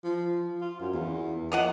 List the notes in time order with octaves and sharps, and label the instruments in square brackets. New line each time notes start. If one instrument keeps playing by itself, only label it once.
[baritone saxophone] F3
F4
F#2
E2
[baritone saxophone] F3 [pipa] A#3 D#5 F#5